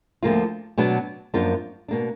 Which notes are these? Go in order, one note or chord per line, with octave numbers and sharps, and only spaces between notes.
D2 D3 F3 A#3 F4
B2 F#3 B3 D4
F#2 F3 A#3 D4 F4
B2 A#3 D4